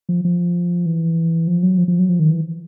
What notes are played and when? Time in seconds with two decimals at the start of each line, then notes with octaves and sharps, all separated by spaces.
0.09 F3
0.25 F3
0.86 E3
1.47 F3
1.63 F#3
1.78 F3
1.88 F3
1.99 F#3
2.09 F3
2.19 D#3
2.30 E3